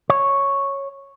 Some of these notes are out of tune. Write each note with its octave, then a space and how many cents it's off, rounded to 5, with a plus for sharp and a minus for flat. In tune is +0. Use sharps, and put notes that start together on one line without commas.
C#5 -5